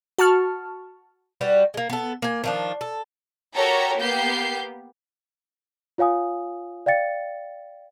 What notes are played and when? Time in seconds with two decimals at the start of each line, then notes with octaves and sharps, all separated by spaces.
0.19 F#4 A5 C#6 F6
1.41 G3 F#4 B4
1.74 G#3 A#3
1.90 B3 A4
2.22 A#3 G#5
2.44 D#3 F3 D4
2.81 A4
3.56 F#4 G4 A4 A#4 C#5 A#5
3.98 A#3 B3 G4 G6 C7
5.98 F4 C#5 F5 G#5 D#6
6.86 D5 F5 G5 A6 C#7